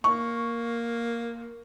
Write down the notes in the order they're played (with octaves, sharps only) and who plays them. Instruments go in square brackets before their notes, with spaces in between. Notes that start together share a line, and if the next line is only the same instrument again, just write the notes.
[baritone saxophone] A#3 [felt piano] C#6